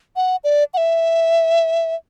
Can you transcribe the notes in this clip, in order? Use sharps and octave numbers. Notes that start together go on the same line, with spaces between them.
F#5
D5
F#5
E5